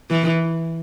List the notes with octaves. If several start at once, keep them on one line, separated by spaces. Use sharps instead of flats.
E3